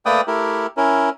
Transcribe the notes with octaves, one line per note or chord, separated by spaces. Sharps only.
A3 A#3 B4 D5 G5 D#6
A3 E4 G4 A#4
C#4 E4 A#4